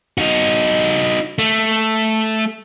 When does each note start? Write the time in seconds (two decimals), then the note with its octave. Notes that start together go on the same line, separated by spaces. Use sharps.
0.18 D#4 F#4
1.39 A3